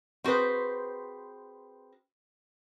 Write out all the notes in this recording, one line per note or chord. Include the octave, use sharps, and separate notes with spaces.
C4 F#4 G#4 B4 C5